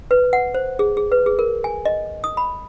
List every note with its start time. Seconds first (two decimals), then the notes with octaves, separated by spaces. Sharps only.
0.11 B4
0.33 F#5
0.54 C5
0.79 G#4
0.97 G#4
1.12 B4
1.26 G#4
1.39 A#4
1.64 G#5
1.85 D#5
2.24 D#6
2.37 B5